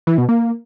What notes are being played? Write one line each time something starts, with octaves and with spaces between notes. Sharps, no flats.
E3
B2
A#3